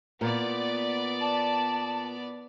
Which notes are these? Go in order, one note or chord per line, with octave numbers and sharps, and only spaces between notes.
A#2 B3 D5
A5